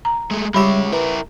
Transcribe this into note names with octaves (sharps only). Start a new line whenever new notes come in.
A#5
G#3 A3
G3 G#3 G4 C#5 E5 B5 D6
E4 A#4 B4